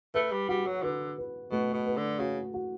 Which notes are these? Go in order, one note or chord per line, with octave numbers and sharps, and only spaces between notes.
A3 B4
G3
G3 F#4
F#3
D3 B4
B4
B2 A3
B2
B4
D3
C#3 F#4
F#4